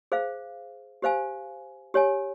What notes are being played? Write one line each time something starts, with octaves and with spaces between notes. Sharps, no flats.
G#4 C5 F5
G4 C5 F5 G#5
G4 C#5 G#5